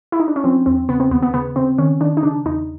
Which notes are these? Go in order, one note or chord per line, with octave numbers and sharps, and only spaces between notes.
E4
D#4
D4
C#4
F3 C4
E2 C4
C#3 B3
C4
D#2 B3
B3
C#3 B3
C#3 C4
D#3 C#4
D#3 D4
D#4
C#3 D4
E2 D#4